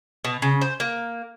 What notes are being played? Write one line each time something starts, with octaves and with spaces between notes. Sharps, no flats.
B2
C#3
C5
A#3